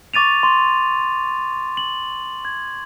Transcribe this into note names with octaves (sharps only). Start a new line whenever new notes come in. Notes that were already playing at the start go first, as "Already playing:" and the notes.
C#6 D6 A6 D#7 F7
C6
F#7
G#6